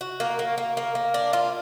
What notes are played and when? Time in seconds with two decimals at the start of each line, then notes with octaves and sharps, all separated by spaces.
0.01 F#4
0.20 A#3
0.39 A#3
0.58 A#3
0.77 A#3
0.95 A#3
1.14 D4
1.33 F4